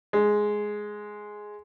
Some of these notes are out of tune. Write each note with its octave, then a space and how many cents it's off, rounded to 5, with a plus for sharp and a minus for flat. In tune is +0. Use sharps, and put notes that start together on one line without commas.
G#3 +5